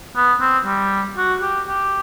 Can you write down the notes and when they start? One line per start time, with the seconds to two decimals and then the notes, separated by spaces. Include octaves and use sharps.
0.16 B3
0.41 C4
0.66 G3
1.17 F#4
1.42 G4
1.67 G4